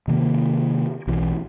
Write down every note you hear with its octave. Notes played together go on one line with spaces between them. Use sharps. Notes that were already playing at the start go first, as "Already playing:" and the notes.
C3 D#3 A#3
B1 E3